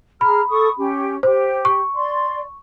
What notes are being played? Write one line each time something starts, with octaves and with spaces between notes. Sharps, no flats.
G#4 A#5 B5 F6
A4 C#6 D#6
C#4 G4
G4 C5
C#6
D5 C6